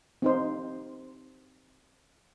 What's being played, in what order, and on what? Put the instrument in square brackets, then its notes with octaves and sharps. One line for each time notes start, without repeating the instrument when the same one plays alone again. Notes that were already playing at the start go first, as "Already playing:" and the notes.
[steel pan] C4 D#4 C5